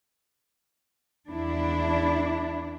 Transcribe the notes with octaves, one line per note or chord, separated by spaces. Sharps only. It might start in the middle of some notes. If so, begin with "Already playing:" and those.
E2 D4 E4